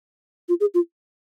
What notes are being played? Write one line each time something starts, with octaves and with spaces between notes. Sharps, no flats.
F4
G#4
F4